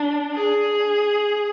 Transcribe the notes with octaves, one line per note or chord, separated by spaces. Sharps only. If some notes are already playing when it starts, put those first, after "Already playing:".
Already playing: D4
G#4